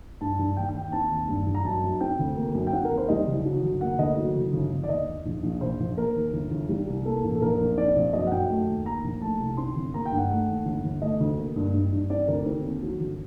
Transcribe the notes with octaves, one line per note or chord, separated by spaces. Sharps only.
G2 A5
G2
D#2 G5
G5
D#2
G5
C4 A5
D#2
G2
G2
A#5
F#2 A5
F#2
C4 G5
D2
A#3
F#2
G5
C4 F#5
A#4
D#2
C5
G3 D#5
F#1
F#3
G1
A#3 F#5
D2 D#5
F#3
F#1
G1
G1
D5
D#2 D#5
D#2
A#1
A#1
A#1 C5
A#1
A#3 A#4
D#2
G1
G1
G3
C2
A#3 A4
A1
A4
A#1 A#4
A#1
C4 D5
A#1
F#2 D#5
F#5
F#2 G5
A3
D#2
A#3 A#5
A#1
A3 A5
C2
C4 C6
G1
A#3 A#5
G5
G2
F#5
A3
D#2
G1
G1
A3 D#5
D2
A#3
G2
G2
G2
C4 D5
D2 A#4
C4
D#2
F#3
G1